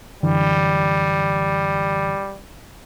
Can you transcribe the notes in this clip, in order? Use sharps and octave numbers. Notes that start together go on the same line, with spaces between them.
F#2 D3 E3 G3